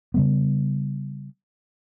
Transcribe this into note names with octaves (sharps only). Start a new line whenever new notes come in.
C#3 G3 B3